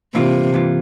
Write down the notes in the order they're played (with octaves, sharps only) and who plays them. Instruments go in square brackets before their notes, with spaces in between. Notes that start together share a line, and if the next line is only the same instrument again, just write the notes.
[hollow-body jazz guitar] G2 E3 A#3 F4 [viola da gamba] C3
[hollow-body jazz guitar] G2 E3 A#3 F4